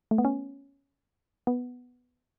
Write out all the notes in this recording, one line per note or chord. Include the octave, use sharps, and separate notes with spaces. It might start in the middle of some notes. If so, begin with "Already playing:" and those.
A3
B3
C#4
B3